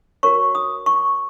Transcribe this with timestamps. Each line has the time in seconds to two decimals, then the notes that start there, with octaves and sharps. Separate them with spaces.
0.23 F#4 A#4 C#5 C#6
0.55 D#6
0.86 C#6